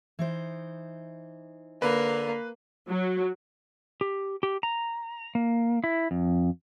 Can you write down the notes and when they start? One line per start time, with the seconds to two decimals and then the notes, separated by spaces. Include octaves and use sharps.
0.19 E3 D#4 C5
1.82 D3 A#3 B4
2.88 F#3
4.01 G4
4.43 G4
4.63 A#5
5.35 A#3
5.84 E4
6.11 F2